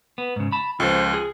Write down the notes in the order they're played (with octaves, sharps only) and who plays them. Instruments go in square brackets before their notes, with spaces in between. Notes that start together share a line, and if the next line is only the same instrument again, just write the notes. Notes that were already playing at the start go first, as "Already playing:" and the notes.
[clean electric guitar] B3
G#2 C#3
A5 B5
[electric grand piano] C#2 F3 [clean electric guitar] F4 A4 C5
[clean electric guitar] G#4